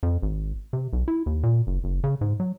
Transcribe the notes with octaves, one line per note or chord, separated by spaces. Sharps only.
F2
G#1
C3
B1
E4
D#2
A#2
F#1
F#1
C#3
G#2
F#3